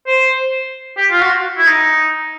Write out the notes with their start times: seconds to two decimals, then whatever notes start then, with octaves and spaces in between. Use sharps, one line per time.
0.07 C5
0.97 G4
1.11 F4
1.21 F#4
1.57 E4
1.67 D#4